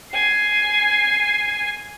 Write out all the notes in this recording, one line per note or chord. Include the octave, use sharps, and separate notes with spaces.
G#5 C7